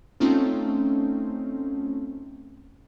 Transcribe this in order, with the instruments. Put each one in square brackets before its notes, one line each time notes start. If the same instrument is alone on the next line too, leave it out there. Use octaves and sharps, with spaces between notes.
[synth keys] A3 C4 C#4 D#4 F4